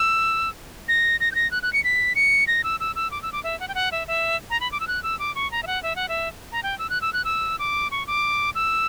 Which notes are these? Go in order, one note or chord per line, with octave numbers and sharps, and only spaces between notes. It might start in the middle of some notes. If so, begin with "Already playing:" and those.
Already playing: E6
A#6
A#6
G6
A#6
F#6
F#6
C#7
B6
C#7
A#6
E6
E6
E6
D6
E6
D6
E5
F#5
G5
F#5
E5
E5
A#5
B5
D6
E6
F#6
E6
D6
C#6
A#5
E5
F#5
E5
F#5
E5
A#5
G5
E6
F#6
E6
F#6
E6
D6
C#6
D6
E6